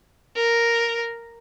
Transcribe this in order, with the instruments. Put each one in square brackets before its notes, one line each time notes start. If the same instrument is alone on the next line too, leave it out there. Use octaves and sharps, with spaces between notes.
[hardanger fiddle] A#4